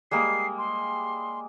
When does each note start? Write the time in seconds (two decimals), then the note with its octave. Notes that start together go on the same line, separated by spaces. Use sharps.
0.11 G3 G#3 A#3 C7
0.58 C6